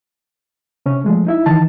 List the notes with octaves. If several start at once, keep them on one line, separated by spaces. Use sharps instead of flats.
C3 C#4
F3 G#3 A3
D#4 E4 E5
D#3 E3 D#4 A5